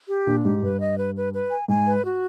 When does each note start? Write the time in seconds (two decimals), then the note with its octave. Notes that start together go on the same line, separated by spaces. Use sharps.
0.09 G4
0.27 A#2 D4
0.45 G#2 G4
0.62 G2 B4
0.80 D#5
0.98 B4
1.15 B4
1.33 B4
1.50 G#5
1.68 G#2 G#5
1.86 B4
2.04 F#4